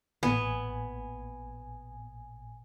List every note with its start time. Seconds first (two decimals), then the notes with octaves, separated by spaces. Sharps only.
0.23 A1 A#2 B3 G#5